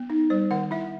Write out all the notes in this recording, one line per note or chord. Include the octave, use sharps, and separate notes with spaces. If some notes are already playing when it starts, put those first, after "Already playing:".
Already playing: B3
D#4
G3 C5
D#3 F#5
E4 E5